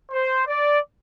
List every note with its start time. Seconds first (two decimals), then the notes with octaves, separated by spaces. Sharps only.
0.11 C5
0.46 D5